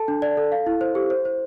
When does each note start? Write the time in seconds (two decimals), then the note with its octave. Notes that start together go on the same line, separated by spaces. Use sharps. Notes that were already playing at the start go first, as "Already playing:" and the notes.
Already playing: A4 A5
0.08 D4
0.22 D5
0.37 A4
0.52 F5
0.66 E4
0.81 C5
0.95 G4
1.10 C5
1.25 C5